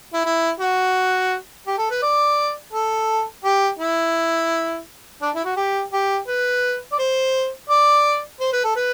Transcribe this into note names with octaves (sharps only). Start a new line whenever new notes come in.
E4
E4
F#4
G4
A4
B4
D5
A4
G4
E4
D4
E4
F#4
G4
G4
B4
D5
C5
D5
C5
B4
A4
B4